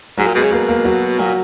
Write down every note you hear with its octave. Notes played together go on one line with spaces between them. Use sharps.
G#2 F#3 F#4
A#2
B2 G#3 G#4
C#3
B2 A#3 A#4
A#3 A#4
F#3 F#4
A#2 F#3 F#4